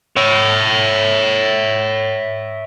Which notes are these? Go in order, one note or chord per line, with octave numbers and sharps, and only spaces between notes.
C#5 E5